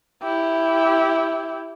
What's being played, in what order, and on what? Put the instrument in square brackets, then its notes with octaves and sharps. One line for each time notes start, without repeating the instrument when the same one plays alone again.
[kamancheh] E4 G4